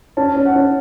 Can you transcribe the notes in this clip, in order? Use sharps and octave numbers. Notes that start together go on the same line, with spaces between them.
C#4 A5
C#4
F#5
C#4